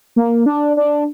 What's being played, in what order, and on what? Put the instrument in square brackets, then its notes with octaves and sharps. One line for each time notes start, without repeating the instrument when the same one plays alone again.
[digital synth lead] A#3
D4
D4